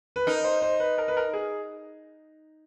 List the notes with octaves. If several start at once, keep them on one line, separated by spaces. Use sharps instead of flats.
B4
D#4 A#4
C5
C5
B4
A#4
B4
A#4
G#4